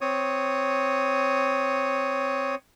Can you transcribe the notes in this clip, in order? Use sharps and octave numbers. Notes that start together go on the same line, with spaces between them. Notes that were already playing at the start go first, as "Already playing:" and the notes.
C4 C#5 D#6